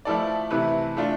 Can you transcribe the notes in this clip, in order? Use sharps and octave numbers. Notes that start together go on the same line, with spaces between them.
F3 A3 E4 A4 D5
C3 E3 A3 E4 B4
A3 D4 F4